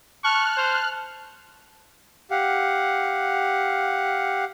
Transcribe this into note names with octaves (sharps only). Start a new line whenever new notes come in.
A5 C#6 F6 F#6
C5
G4 F5 F#5